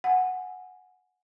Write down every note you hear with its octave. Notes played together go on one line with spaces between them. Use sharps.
F#5 G#5